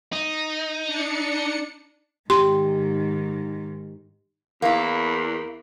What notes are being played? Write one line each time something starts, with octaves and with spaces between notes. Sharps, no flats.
D#4
D4 C#7
G#2 D#3 G4 C6
E2 A#3 E4